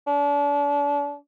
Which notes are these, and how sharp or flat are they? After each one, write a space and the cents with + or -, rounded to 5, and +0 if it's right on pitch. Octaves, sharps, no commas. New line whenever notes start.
D4 -35